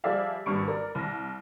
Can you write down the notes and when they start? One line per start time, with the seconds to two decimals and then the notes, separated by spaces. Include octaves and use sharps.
0.04 F3 G3 G#4 D5 E5 F5
0.46 G#1 G2 G3 C#6 C#7 D7
0.68 A#4 D5
0.95 C2 A#6